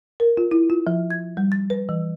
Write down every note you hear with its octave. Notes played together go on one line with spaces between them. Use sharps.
A#4
F4
E4
F4
F3
G#6
G3
A6
B4
E3